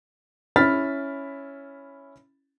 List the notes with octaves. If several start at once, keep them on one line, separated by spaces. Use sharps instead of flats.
C#4 E4 B5 F6 A6 B6